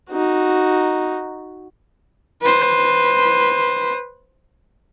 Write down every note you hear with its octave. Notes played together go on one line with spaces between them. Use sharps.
D#4 F#4
B4 C5